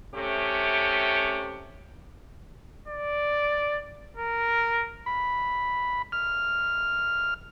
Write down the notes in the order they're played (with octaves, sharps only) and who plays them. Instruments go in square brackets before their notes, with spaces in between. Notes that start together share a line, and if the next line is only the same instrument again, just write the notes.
[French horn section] C3 A3 C#4 G4
[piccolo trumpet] D5
A#4
[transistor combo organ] B5
F6